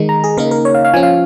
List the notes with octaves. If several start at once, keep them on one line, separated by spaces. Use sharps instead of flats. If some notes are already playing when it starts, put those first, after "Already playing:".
Already playing: D#3 G#3 D#4
A#5
G#4
C#3 A#3 D#4 A#4
A#4
C#5
F5
F5
F3 C#4 G#5
F5